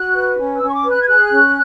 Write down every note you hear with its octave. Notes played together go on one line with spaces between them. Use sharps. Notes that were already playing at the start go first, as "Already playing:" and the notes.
Already playing: F#4 F#6
B4
C#4
E6
C#4
C#6
D6
B4
F#6
G#6
G#4 F#6
C#4